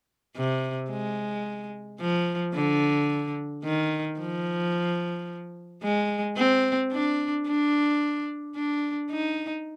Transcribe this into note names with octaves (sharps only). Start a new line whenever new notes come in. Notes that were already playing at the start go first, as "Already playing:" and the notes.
C3
G#3
F3
D3
D#3
F3
G#3
C4
D4
D4
D4
D#4